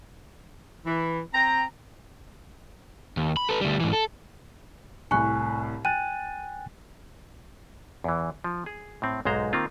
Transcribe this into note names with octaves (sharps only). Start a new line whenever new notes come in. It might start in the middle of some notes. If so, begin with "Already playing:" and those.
E3
C4 G5 A#5
D#2
B5
A4 B4
D2 G3
G#2 E3
A4
C2 A2 G#5 C#6 F#6
G5 G#5 F#6 A6 D#7
E2 E3
F3
G#4
A2 C4
B1 G#2 G#3 C5 A#5
D#3 A#3 C4 F4